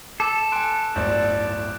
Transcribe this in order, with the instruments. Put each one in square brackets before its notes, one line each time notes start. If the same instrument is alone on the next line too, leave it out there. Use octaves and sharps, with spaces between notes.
[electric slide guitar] A4 [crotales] D6 E7
[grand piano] G#5 C6 [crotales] F#6 D7
[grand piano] D1 G1 D2 [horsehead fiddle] D5 [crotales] G6